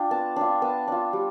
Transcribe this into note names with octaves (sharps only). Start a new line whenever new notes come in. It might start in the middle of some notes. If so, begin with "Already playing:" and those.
Already playing: D4 F4 G5
B3 A5
D4 F4
B3 A5
D4 F4
G3